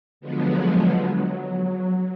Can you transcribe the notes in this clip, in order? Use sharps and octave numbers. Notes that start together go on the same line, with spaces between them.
D3 F3 F#3 G#3 B3
F#3